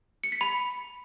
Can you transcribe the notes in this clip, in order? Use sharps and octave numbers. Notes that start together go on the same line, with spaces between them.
C#7
B6
B5